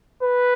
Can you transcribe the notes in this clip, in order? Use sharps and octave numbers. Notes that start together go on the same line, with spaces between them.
B4